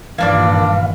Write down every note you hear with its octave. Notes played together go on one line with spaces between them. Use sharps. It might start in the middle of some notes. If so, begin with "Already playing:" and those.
G2 A#2 D#3 E3 A#3 D4 D5 F5